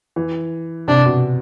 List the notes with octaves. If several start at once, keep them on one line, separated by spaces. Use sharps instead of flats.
E3
C3 D4
B2